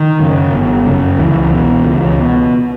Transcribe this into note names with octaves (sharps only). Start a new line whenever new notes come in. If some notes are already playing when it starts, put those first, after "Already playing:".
Already playing: D#3
F#2 C#3
G1
F#2 C#3
C#2 E3
B2
C#2
B2